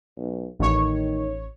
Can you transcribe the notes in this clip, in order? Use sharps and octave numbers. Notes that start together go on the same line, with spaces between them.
B1
A1 D#3 C#5